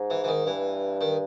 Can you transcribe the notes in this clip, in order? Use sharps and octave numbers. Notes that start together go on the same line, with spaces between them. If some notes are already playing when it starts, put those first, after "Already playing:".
Already playing: G#2
E3
E3
D#3
G2 E3
D#3